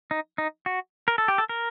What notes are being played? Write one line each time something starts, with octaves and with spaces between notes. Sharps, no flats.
D#4
D#4
F#4
A#4
A4
G4
A4
A#4